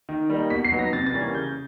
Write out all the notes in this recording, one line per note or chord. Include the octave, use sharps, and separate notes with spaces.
D#3
G3 A#3 D#4
B2 B6
C7
F#3 B3 D#4
A#6
C3 A6
A6
E3 G3 A#3 C#4
G#6
C#3 G6